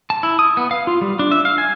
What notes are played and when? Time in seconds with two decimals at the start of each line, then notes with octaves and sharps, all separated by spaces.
0.10 A5
0.23 E4
0.39 D#6
0.57 B3
0.71 F5
0.87 F4
1.01 G3
1.19 D4
1.31 E5
1.45 F5
1.58 G#5